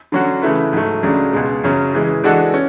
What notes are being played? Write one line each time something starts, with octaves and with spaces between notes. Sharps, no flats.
D3 F#3 C#4 F#4
C#3 E3 A3 E4 B4
G#2 F#3 A3
C#2 C#3 F#3 A3 D4
C#2 B2 G#3
F#2 C#3 F#3 C#4
C#3 E3 G#3
E3 G#3 D4 F#4 A4
C#4